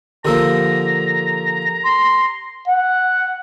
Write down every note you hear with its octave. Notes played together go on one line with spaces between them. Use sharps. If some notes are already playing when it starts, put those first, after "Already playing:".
D3 F3 A#3 G4 A#4 A#5 E6
C6
F#5